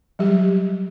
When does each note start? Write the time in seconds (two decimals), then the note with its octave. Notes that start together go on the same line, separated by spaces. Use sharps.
0.19 F#3 G3 G4